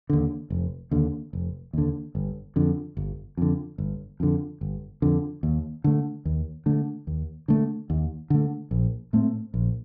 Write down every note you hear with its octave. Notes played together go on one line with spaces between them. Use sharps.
D#2 D3
F1
D#2 D3
F1
D#2 D3
G1
F2 D3
G1
F2 D3
G1
F2 D3
G1
F2 D3
D#2
D3 A3
D#2
D3 A3
D#2
D3 A3
D#2
D3 A3
A#1
A2 A3 C4
A#1